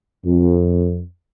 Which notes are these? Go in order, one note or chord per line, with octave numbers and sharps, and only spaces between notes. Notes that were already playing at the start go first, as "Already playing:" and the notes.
F2